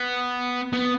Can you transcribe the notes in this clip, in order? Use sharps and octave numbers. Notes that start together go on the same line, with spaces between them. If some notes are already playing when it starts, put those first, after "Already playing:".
Already playing: B3
B3